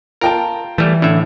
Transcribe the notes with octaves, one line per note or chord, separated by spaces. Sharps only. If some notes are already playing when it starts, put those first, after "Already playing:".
F4 A#4 G5 A5
E3 G3 A3
A2 D3 E5